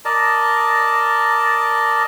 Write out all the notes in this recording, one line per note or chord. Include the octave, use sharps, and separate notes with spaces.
A#4 D5 D#5 A5